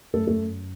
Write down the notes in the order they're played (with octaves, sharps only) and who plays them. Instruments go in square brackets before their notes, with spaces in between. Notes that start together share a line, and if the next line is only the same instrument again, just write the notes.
[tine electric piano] F#2 [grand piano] A3 A4
[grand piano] A3 A4